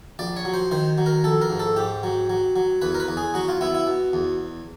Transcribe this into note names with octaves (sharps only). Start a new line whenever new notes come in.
A#1 D5
C#5
F#3
C5
D#3 C5
F#3
A#4
A#1 A4
A#4
G#2
A4
G#2 G4
F#3
F#3
F#3
E2 B4
A#4
B4
E2
G#4
F#3 F#4
F4
B3 E4
E4
B2
E2